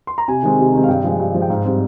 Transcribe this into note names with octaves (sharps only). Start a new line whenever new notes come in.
C6
A#5
C3 G#5
D#3 G#3 C4
C3
D#3 G#3 C4
F5
G2 G5
F3 G#3
G2
F3 G#3
G5
G#2 F5
G3 C4